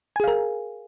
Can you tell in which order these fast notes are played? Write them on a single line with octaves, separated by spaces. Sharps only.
G#5 G#4 F5 A#4